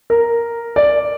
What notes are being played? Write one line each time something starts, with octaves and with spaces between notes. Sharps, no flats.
A#4
D5